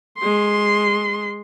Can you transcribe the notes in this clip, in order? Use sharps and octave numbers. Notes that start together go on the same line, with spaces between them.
G#3 C6